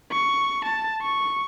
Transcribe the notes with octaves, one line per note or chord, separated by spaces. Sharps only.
C#6
A5
C#6